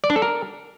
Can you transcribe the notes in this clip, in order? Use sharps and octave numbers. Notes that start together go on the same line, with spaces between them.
D5
D4
A4
A#4